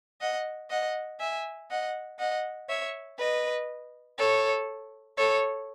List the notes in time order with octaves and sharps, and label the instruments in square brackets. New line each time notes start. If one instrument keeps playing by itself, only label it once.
[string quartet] D#5 F#5
D#5 F#5
E5 G#5
D#5 F#5
D#5 F#5
C#5 E5
B4 D#5
A4 C#5
A4 C#5